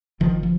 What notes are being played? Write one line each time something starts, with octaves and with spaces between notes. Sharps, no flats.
G1 G2 D3 D#3 F3
F3